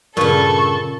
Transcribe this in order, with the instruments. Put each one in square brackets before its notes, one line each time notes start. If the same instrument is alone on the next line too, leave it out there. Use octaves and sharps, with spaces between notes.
[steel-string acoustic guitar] G2 C#3 [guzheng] A#2 B4 [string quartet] A4 [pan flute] C#6